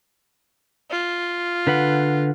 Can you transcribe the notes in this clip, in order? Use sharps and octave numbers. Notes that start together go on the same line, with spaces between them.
F4
D3 B4 F#5